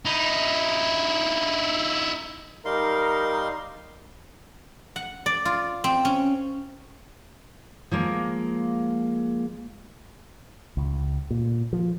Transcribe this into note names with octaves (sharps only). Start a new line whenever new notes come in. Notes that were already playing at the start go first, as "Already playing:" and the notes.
D#4 E4
G3 D#4 A#4 F5 C6
F#5
D5
F4
C4
C#4
F3 G#3 A#3
C#2
A#2
F3